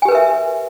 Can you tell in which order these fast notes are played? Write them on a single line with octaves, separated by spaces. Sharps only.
G#5 G4 B4 A#4 E5